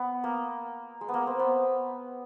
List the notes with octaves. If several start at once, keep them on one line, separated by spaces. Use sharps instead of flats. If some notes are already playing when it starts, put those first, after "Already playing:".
Already playing: B3
A#3
G#3
B3
A#3
C4
B3